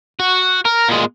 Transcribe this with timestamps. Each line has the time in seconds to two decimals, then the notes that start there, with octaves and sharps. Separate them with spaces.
0.20 F#4
0.65 A#4
0.88 A#2 G#3